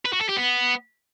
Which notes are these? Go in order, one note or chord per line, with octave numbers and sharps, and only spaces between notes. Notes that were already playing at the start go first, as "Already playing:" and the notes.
B4
F#4
A4
G4
B3